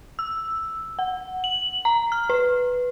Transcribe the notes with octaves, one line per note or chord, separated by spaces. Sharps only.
E6
F#5
F#7
A#5
F6
B4